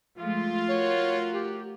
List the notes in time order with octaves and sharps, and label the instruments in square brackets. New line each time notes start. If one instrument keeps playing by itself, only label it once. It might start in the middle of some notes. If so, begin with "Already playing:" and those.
[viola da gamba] F3 G#3 A3 [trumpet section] F4
[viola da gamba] A3 F#4 A#4 [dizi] C#5
[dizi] G4